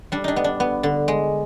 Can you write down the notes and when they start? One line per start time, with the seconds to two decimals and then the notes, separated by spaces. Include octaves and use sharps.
0.12 G3 D4
0.24 D4 D#4
0.36 B3
0.44 D4
0.60 B3
0.83 D3
1.08 G#3